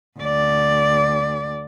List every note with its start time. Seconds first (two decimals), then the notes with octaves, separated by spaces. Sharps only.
0.20 D2 D5